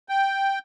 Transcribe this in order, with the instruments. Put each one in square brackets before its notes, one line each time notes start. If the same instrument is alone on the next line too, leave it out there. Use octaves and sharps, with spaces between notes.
[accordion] G5